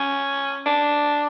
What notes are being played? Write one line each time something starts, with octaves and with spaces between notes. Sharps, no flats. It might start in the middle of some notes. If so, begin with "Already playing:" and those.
Already playing: C#4
D4